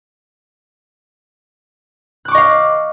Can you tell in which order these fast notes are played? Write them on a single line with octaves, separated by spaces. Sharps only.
F#6 D6 C#6 D#5 F5